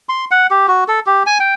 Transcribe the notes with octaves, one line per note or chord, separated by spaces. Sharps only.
C6
F#5
G4
F#4
A4
G4
G#5
G5